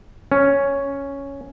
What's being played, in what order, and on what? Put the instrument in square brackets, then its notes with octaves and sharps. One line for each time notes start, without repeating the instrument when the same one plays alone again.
[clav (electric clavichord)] C#4